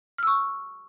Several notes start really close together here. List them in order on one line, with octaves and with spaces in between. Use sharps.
F6 E6 C#6